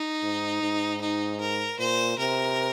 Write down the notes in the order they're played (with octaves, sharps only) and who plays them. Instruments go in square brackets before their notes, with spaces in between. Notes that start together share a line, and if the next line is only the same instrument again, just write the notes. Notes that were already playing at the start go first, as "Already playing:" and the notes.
Already playing: [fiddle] D#4
[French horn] G#2
G#2
[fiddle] D#4
A#4
[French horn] A#2 [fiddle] C5
[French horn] C3 [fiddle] A#4